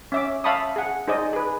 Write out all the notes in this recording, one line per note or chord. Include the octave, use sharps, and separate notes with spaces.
C#4 E5 D6
E5 F5 A5 B5 C#6 D#6
G#4 F#5
D#4 G#4 C5 D5 D#5
G#4 B4